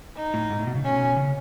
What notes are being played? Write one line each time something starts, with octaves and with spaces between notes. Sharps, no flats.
D#4
A2
G#2
A2
B2
C#3
B2 C#4
C#3